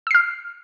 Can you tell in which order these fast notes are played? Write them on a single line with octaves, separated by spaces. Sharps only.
E6 C7 F6